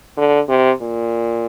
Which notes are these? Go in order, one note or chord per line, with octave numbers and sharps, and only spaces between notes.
D3
C3
A#2